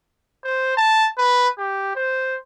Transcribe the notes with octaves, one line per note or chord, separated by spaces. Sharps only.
C5
A5
B4
G4
C5